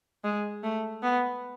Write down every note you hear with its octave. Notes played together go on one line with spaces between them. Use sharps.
G#3
A3
B3